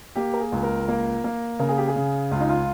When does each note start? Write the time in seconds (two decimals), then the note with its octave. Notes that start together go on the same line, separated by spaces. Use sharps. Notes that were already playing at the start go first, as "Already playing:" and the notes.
0.16 A#3 G4
0.34 A#4
0.40 G#4
0.52 C#2
0.63 A#4
0.88 A#3
1.24 A#3
1.59 C#3 A#4
1.69 G#4
1.78 G4
1.88 G#4
1.96 C#3
2.31 C#2 F4
2.41 D#4
2.49 F4